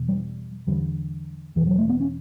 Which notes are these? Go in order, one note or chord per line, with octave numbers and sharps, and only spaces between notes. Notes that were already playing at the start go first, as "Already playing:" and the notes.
Already playing: E2 B2
G3
E2 D3 G3
E2 B2 E3
F#3
A3
B3
C#4